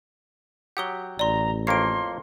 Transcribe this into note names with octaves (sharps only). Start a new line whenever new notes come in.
F#3 G4 F#5 D#6 G7
A1 D5 A#5 C6
F2 A#3 C#5 C6 C7 D7